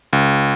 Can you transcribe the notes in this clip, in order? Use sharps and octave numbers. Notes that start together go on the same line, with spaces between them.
C#2